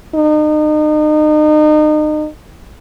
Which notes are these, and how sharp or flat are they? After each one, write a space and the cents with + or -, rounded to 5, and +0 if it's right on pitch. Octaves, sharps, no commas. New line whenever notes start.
D#4 -35